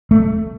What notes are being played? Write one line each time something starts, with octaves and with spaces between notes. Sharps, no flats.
A3